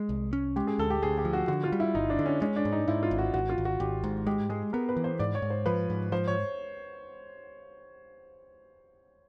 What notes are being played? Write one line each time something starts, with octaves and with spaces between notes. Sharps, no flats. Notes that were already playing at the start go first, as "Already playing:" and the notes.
Already playing: G#3
C2
C#4
G#3 G4
G#4
D2 A4
G4
D2 G#4
G4
F3
F#4
D3 F#4
F4
G3
E4
G1 D#4
D4
D3
C#4
G#3 C#4
D4
G#2
D#4
G#2 E4
F4
G#1
F#4
G#1 F#4
F4
G#1
F#4
G#1 G4
G#2
G#3 G4
G#3 G#4
B3 A#4
B4
E3
C5
G#2 D5
C#5
G#2
C5
F3 B4
G#2
F3 C5
C#5